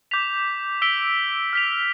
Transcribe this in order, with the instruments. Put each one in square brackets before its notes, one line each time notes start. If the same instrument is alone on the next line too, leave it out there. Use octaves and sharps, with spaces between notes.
[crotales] D6 G6 B6 F7
E6 B6 D7 G7
F6 B6 F7